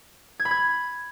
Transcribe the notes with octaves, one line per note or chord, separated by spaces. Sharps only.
G#6
B5
G#6